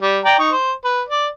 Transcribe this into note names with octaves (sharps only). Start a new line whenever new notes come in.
G3
D5 G5 A#5
D#4 C#6
C5
B4
D5